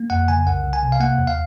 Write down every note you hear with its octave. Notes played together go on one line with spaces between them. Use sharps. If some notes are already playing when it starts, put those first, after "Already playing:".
Already playing: A#3
F2 F#5
C#3 G#5
C2 F#5
C2
G#5
C3
F5
A#3 F#5
D#2
F5